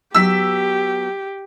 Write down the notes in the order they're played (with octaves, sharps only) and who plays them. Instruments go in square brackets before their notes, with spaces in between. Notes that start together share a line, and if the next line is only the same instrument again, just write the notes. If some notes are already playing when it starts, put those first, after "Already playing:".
[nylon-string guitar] F#3 B3 [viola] G4 [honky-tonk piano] E6 B6